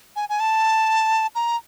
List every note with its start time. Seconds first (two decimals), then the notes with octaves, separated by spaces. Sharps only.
0.16 G#5
0.29 G#5
0.40 A5
1.35 A#5